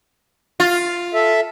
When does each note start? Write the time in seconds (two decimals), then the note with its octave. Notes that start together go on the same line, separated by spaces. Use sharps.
0.60 F4
1.14 A4 E5